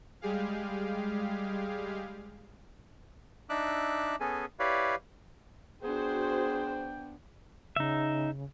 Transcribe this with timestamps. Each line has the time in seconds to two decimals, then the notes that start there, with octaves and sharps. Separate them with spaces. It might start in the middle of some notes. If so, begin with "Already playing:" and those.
0.21 G3 G#3 G4 G#4 F5
3.50 D4 D#4 E5 D6 E6 F#6
4.20 B3 C#4 G#4 A4 G#5
4.59 E4 G4 B4 C#5 D5 F5
5.83 B3 D4 F#4 G#4 C5 G5
7.76 C#3 D#4 E5